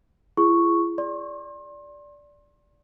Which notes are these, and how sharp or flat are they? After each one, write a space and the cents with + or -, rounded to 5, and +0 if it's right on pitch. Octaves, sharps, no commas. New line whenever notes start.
E4 +45 G#4 +0 C#6 +0
D5 -10 C6 +35